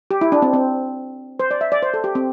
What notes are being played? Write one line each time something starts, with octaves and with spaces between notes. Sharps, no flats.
G4
E4
D4
C4
C4
C5
D5
E5
D5
C5
A4
G4
C4